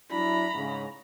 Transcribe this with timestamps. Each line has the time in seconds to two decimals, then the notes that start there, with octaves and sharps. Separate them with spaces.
0.11 F#3 D4 E4 A#5 B5
0.55 G#2 C#3